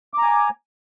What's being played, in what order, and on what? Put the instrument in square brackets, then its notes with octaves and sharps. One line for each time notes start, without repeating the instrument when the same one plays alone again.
[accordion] D6
A#5
G#5